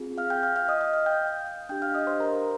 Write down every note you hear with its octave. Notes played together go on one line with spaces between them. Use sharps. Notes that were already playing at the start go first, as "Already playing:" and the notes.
Already playing: C4 F4 G#4
F5 F6
G5 G6
F5 F6
F5 F6
D#5 D#6
D#5 D#6
F5 F6
G5 G6
D4 G4 G5 G6
F5 F6
D#5 D#6
C5 C6
A#4 A#5